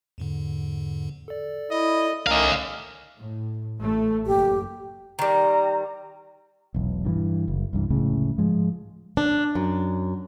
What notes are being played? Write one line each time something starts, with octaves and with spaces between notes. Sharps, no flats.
E2 G#2 D3
A4 D5
E4 D#5
C2 D#3 A3 C#4 A#4 D#5 F5
A2
A1 A3
F#1 G4
D#3 G3 A#5
E1 B1
G2 D#3 E3
F#1
C2 G2 E3
F1 C#2 A2 C#3
G#2 F3 G#3
D4
F#2